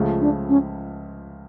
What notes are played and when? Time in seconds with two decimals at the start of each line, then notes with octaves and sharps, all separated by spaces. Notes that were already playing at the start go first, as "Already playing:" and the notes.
Already playing: C#2 C#3 F3 A3
0.21 D4
0.49 C#4